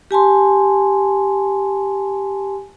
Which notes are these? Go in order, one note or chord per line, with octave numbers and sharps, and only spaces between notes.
G4 G#5 A5 C6